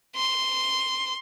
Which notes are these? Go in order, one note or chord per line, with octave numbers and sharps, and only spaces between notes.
C6